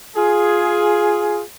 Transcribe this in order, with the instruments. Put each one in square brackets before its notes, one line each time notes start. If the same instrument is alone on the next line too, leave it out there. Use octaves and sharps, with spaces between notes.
[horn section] F4 G#4